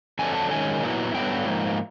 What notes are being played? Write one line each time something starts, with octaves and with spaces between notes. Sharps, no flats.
F2 D3 F#3 A3 G#5
A5
F#2 D#3 G#3 C#4 G#5
A#2 F#3 B3 E4
G2 D3 F#3 B3 G5
G#2 F3 A#3